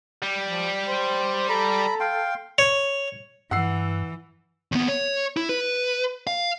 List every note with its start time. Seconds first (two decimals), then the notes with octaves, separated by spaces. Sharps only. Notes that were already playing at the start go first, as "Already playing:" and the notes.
0.23 G3
0.45 F3
0.87 C5
1.49 A4 A#5 B5
2.00 F5 G5 C6
2.58 C#5
3.51 G2 E3 F#5 E6 C7
4.72 D#2 B3
4.88 C#5
5.37 E4
5.49 B4
6.27 F5